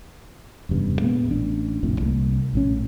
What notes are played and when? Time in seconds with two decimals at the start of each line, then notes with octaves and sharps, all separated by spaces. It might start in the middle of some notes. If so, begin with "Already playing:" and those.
0.69 F1 E2 G2 C#3
1.00 A#2 G#3 A#3 B3
1.28 A1 D4
1.83 F1 A#1 F2 A2
2.00 C2 G#3 A#3
2.53 A#1 A2 C#4